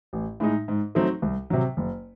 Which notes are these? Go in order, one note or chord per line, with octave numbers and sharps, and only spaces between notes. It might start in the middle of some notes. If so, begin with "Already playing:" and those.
A1
A2 G#3 D#4
G#2
F#3 A3 C4 D#4
C2
C3 F#3
F#1